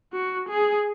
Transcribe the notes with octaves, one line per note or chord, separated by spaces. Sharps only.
F#4
G#4